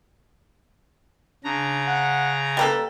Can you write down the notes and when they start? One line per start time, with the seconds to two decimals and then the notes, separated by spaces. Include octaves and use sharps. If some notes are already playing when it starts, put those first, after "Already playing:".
1.44 C#3 D4 A#5
1.87 F#5
2.57 G3 A#3 A4 B4